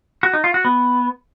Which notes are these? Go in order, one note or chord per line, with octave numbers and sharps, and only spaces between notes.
F#4
D#4
F4
F#4
B3